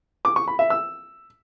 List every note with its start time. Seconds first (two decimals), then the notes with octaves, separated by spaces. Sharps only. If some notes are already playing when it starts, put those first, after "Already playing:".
0.25 D6
0.36 C#6
0.48 B5
0.59 E5
0.70 E6